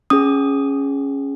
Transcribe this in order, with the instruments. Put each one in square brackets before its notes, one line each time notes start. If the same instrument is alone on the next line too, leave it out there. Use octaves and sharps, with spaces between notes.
[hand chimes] C#4 G#4 D#6